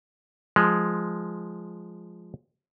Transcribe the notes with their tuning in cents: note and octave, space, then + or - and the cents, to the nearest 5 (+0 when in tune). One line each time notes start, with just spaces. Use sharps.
F3 +0 G#3 +0